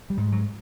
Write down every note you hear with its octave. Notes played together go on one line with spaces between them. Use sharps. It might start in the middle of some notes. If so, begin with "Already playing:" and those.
G3
G#2
F#3